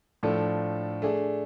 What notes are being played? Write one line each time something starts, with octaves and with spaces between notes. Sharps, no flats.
A2 F3 A3 D4 A4
A3 D4 G#4